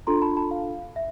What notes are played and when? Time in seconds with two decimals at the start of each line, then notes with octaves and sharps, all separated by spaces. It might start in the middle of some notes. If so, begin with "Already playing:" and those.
0.07 D4 F4 A4 A#5 C6
0.22 A5 B5
0.37 A5 B5
0.51 F5
0.96 E5